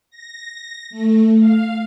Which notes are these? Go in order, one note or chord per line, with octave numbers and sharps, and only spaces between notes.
A#6
A3
F5